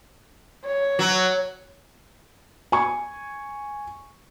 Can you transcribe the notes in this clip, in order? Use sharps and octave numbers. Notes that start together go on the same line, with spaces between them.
C#5
F#3
G#5 C#6